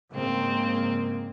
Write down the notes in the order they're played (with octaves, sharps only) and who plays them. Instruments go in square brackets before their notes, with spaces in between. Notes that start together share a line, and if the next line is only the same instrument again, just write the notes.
[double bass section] G#2 C#3 A#3 [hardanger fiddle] C4